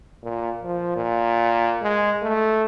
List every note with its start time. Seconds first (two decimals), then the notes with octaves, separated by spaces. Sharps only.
0.23 A#2
0.63 F3
0.96 A#2
1.83 G#3
2.23 A3